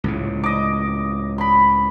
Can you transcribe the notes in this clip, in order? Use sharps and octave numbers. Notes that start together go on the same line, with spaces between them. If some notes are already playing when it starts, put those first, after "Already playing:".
C#2 A2 C#3
D#5 D6
B5 C6